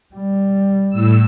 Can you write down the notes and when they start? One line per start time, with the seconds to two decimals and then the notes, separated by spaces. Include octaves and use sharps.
0.15 G3
0.89 A2 E6